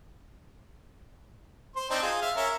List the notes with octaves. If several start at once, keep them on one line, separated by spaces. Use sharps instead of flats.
C5 C6
C4 D4 D#4
F4 G#4
E5 F5
C#4 A#4 E5